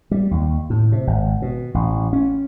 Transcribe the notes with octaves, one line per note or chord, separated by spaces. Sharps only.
G3
D#2
A2
C3
G#1
B2
A1
C#4